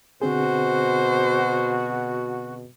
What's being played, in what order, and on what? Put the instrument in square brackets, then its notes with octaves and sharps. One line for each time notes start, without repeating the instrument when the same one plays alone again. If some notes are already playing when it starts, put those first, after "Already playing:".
[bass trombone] B2 [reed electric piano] D3 C4 G#4 [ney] F#4 [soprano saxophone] C5